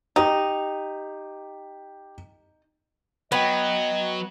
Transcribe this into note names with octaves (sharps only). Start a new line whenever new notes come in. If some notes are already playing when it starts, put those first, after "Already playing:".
D#4 G4
F#3 B3 D#5 F#5 G5